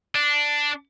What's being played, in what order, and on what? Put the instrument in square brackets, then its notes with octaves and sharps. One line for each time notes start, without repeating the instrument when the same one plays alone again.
[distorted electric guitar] D4